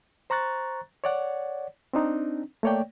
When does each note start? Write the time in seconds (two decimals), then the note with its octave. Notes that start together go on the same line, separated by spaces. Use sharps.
0.30 C5 A#5 C#6 F#6 A6
1.04 C#5 D5 F#5
1.93 C4 D4 D#4
2.63 A3 A#3 C#5 D5 G5